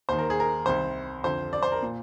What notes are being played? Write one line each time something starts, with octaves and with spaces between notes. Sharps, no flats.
D#2 D#3 C5
A#4
G#4
A#4
C2 C3 D#3 C5
F2 D3 C5
D5
C5
A#4
A#2